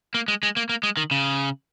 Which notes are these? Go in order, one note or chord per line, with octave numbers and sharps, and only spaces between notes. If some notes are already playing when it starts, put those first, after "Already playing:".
A#3
G#3
G#3
A#3
A#3
G#3
D#3
C#3